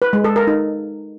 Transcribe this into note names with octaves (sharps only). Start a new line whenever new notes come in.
B4
G#3
A4
A#4
D#4